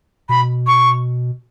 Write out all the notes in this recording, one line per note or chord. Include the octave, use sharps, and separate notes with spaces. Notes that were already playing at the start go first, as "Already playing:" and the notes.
B2 B5
C#6